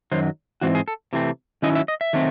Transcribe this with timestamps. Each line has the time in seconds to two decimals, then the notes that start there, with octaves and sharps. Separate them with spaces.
0.12 F#2 D#3 F#3 C5
0.61 G#2 E3 C4 F#4
0.75 G#4
0.88 A4
1.13 C3 E3 A3 C4
1.62 D#3 F#3 C#4 E4 D#5
1.75 E5
1.88 D#5
2.01 E5
2.13 D#3 F#3 A3 C4